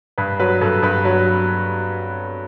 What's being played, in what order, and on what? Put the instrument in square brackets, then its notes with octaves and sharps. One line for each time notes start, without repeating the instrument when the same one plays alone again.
[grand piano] G2 B4
F#3 B4
G2 A4
G2 B4
F#3